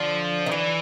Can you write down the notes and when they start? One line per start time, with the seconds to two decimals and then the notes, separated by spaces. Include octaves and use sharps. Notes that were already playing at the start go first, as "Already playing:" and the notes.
Already playing: D3 F3
0.46 D#3
0.51 D3 E3